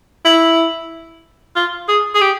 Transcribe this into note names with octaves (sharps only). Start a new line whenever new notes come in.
E4
F4
G#4
G#4
G4